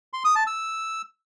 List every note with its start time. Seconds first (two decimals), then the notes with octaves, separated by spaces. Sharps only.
0.13 C6
0.25 D#6
0.36 A5
0.47 E6